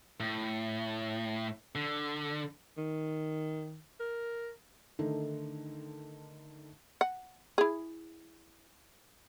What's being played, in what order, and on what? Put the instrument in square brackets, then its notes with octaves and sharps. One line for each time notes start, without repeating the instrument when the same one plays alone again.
[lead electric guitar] A2
D3
[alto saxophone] D#3
A#4
[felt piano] D3 D#3 A3 D#4 A4
[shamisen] F#5
E4 G#4